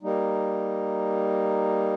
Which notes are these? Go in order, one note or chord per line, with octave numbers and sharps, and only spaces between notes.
G3 A#3 D#4